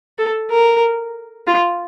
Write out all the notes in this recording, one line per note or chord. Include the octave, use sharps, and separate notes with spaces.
A4
A#4
F4